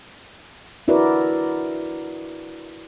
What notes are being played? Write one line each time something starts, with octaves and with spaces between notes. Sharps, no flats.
D4 E4 F#4 A#4 B4 D5